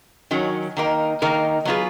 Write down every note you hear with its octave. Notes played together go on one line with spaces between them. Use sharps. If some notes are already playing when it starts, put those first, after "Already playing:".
D#3 F#3 C#4
D#3 A#3 D#4 A#4
D#3 A#3 D#4 A#4
F#3 B3 F4 G#4 B4